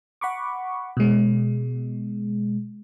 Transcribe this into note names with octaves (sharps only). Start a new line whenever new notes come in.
F#5 B5 C#6 D6
B2 G#3